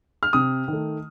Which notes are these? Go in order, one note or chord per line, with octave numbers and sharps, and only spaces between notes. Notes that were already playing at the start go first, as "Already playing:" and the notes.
F6
C3 D#6
D#3 A3